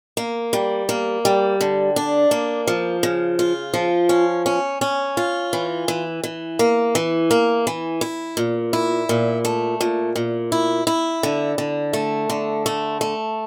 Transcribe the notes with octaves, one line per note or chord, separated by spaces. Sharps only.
A#3
G3
A#3
G3
D3
D4
A#3
F3
C#3
F4
F3
C#4
C#4
C#4
F4
E3
E3
E3
A#3
E3
A#3
E3
E4
A#2
E4
A#2
A3
A#2
A#2
E4
E4
D3
D3
A3
D3
A3
A3